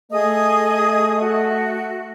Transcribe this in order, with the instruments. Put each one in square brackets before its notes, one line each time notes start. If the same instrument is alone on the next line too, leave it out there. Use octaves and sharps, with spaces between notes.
[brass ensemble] A3 [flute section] G#4 D#5 D#6
[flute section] F#4